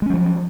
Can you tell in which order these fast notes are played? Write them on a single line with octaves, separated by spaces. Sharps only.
G#3 C#4 F#3 F3